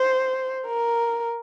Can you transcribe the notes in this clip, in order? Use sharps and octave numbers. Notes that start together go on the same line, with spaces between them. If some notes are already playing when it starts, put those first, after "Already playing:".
Already playing: C5
A#4